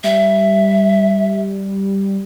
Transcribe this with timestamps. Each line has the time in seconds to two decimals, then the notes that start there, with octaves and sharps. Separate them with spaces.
0.04 G3 E5